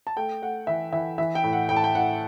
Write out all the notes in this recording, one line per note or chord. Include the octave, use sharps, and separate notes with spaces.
A5
A3 G5
A3 F#5
E3 E5
E3 E5
E3 E5
G5
A2
F#5
A2 G5
A5
G5
A2 F#5